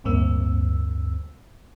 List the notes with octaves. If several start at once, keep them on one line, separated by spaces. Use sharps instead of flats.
A1 D2 G2 A#3 C4 E6